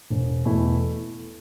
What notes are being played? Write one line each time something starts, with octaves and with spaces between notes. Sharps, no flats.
E1
E2 B2 A3 E4